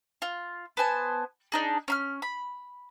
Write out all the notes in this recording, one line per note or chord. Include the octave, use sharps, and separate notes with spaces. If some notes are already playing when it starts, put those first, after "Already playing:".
F4
B3 C5 G#5 A5
D4 D#4 G#4
C#4 B5 F6
B5